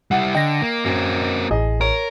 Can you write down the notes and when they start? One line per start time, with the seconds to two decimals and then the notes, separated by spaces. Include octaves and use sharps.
0.11 G3 E4 F#5
0.35 D3 D#5 G5 A#6
0.62 A#3
0.85 F#2 A#3 C4
1.51 A1 G#4 D#5
1.81 A#4 C#5